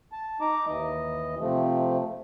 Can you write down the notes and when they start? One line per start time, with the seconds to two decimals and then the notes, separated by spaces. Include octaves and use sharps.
0.12 A5
0.41 D#4 A#5 D6
0.67 D#2 E3 D#5
1.40 C3 F3 A3